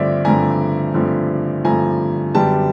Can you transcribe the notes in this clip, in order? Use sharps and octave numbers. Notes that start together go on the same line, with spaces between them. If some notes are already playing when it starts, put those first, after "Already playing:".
Already playing: G2 D3 F3 A3 C4 D5 E5
G2 D3 F3 A3 C4 G#5 A#5
G2 D3 F3 A3 C4
G2 D3 F3 A3 C4 G#5 A#5
F#2 D3 G3 B3 G5 A5